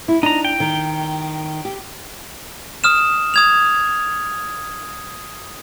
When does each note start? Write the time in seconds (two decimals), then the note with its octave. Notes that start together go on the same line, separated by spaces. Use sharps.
0.08 E4
0.23 D4 D#4 A#5
0.45 G5
0.60 D#3
1.65 G4
2.84 D#6 F6 E7
3.34 D#6 G#6 F7